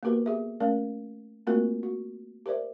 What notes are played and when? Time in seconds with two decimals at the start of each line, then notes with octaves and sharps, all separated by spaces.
0.03 A#3 B3 F#4 G4 A#4 B4
0.26 B3 G4 G#4 E5
0.60 A3 C#4 A#4 D5 F5
1.47 A3 A#3 C4 F4 F#4 A#4
1.83 F#4
2.46 G4 A#4 C5 D5 E5